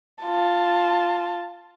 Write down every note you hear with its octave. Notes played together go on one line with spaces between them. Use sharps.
F4 A5